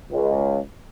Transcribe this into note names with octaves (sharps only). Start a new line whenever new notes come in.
C#2